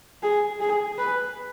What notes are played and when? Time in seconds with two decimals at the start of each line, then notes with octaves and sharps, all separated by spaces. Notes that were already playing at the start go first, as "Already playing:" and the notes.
0.23 G#4
0.60 G#4
0.98 B4